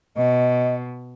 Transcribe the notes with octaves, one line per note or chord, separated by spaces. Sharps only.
B2 D#5